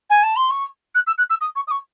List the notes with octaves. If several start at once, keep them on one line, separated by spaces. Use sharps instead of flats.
G#5
A5
C6
C#6
F#6
E6
F#6
E6
D#6
C#6
D#6
C#6